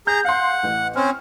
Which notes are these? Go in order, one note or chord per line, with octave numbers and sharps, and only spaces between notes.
G#4 A#5 G6
F5 F#5 C6
A1
C4 C#4 C5 F6